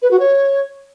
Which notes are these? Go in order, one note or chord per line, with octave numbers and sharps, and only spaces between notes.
B4
F#4
C#5